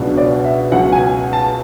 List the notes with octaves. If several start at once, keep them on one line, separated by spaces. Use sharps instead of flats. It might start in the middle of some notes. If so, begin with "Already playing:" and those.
Already playing: C#2 B2 F#3 B3 D4
D5
E5
C#2 B2 F#3 C#4 F#5
G#5
A5